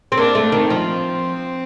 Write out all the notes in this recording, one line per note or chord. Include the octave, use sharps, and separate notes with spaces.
C4
A#3 D4
A3
D#3 C4
F3